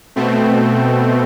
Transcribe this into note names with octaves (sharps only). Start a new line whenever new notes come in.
B2 A3 C4